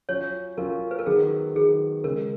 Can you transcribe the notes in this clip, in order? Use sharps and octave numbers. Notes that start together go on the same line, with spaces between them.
F#3 C#4 F4 C#5
F#3 C#4 F4 A#4
B4
A#4
D#3 F#3 B3 G#4
D#3 F#3 B3 G#4
C#3 G#3 B3 A#4